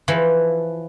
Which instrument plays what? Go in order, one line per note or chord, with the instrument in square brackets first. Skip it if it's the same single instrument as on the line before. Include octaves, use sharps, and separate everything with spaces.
[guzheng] E3 F3